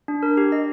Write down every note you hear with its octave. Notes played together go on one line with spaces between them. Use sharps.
D4
A#4
G4
D#5